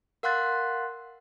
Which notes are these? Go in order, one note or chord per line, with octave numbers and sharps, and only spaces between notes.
A#4 F5 F#5 C6 F#6 A6